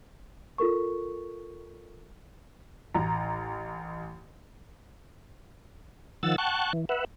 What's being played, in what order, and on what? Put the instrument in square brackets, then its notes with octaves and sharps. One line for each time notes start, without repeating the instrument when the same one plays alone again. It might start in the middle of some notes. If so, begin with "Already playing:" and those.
[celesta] F4 A4 A#4 C#6
[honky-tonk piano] A1 A#5
[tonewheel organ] D#3 F3 F#5 E6 A6
F#5 G5 A5 C#6 F#6
E3
B4 E5 F#5